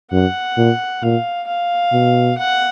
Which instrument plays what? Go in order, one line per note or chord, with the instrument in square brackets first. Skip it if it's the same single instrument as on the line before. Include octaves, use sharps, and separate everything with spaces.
[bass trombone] F#2 [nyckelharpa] F#5
[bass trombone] A#2
[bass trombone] A#2 [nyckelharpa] F5
[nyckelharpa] F5
[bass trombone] B2
[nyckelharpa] F#5